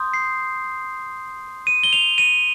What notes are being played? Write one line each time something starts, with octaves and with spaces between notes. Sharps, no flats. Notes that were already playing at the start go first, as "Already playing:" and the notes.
Already playing: C6 D#6 G6
C7
D#7
G7
F7
D#7